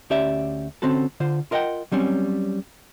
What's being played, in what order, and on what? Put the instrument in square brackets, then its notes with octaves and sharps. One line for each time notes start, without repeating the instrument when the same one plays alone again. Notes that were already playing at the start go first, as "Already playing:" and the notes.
[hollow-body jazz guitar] D2 C#4 G4 D5 E5
D3 C4 C#4 F#4 A4
D3 F4 C5
F4 A#4 D#5 E5 F#5 G5
F#3 G3 C4 C#4